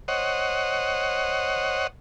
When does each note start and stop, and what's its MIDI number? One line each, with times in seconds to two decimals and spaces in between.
0.08 1.87 72
0.08 1.87 73
0.08 1.87 75
0.08 1.87 78